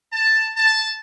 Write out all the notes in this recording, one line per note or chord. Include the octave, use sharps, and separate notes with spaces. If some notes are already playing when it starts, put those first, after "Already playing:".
A5
A5